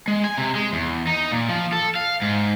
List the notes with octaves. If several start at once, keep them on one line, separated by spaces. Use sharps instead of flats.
G#3
G#5
C3
G#3
E2
D#4
A#2
F3
A4
F5
G#2